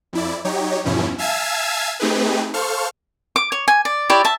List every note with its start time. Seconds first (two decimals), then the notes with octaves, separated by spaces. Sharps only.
0.13 F2 E4 D5
0.44 F#3 D#4 G4 C#5
0.85 E2 G2 B2 F3 C#4 E4
1.18 E5 F5 G#5 A5 E6 G#6
2.00 A3 C4 D#4 G4 G#4 B4
2.54 A4 C5 F5 C#6 F6
3.36 D6
3.52 C#5
3.68 G#5
3.85 D5
4.10 E4 G4 C#5 D5
4.25 E5 A5